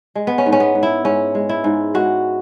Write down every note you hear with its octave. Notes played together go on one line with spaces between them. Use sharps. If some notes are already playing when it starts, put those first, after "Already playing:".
G#3
B3
C#4
G#2
C#4
B3
G#2
E4
G#2 C#4
G#3
E4
G#2
G#3 F#4